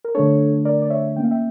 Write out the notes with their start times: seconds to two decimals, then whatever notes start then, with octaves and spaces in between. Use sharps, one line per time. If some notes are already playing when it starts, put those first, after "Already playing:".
0.04 A#4
0.15 D3 A3 D4 A4 C#5
0.65 A#4 D5
0.82 D5
0.90 C#5 E5
1.16 E3 A#3 C#4 G5
1.24 F5
1.31 E5 G5